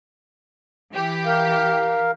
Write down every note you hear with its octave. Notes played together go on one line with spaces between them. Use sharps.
E3 G4
A#4 F5